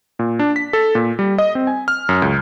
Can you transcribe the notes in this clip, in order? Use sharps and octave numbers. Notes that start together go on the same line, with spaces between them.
A#2
D4
B6
A4
A#2
G3
D#5
C4
G#5
F6
F#2
C#2